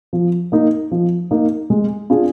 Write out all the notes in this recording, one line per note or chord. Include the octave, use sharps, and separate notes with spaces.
F3
A#3 D#4
F3
A#3 D#4
G#3
D4 F4 G#4